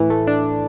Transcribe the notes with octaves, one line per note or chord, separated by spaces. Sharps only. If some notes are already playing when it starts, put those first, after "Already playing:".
Already playing: A2 E3
A3
D4